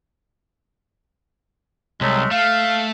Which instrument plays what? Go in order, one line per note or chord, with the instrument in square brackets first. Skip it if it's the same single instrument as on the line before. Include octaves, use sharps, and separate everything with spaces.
[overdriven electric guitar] C2 [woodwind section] F#3 G#3 A3
[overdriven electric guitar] A3 [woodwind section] F5